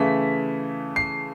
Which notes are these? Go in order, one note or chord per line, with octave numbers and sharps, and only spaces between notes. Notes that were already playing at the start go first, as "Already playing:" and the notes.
Already playing: C#3 E3 A3 B6
C7